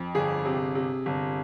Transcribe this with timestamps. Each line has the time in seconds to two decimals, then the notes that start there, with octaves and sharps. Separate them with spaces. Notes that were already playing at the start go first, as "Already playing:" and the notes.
Already playing: F2
0.15 G1 G#4
0.45 C3
0.75 C3
1.06 G1